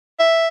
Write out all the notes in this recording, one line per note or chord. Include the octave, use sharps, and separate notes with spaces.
E5